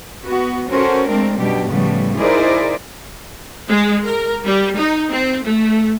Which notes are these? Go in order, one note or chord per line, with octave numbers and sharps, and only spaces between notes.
B3 F#4
C#4 F#4 A4 A#4 C5
G#3 A3 C4 D4 A#4
F#2 B2 F#3 G3 D4 G4
A2 C#3 F3 G3 A3 B3
D#4 E4 G#4 A#4 C5 D5
G#3
A#4
G3
D#4
C4
A3